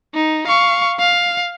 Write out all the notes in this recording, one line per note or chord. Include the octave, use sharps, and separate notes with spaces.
D#4
F5 C#6
F5